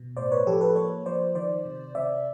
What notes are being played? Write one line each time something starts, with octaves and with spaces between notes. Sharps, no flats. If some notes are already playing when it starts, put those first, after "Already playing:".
Already playing: B2
A2 C5 D5
B4 C#5
F3 G4 A4
A4 B4
A#3 B4 C#5
F3 C5 D5
D#3 C5 D5
C3
C3 D5 E5